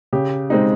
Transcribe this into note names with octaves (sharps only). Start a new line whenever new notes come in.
C#3 G4
G#3 C4 D#4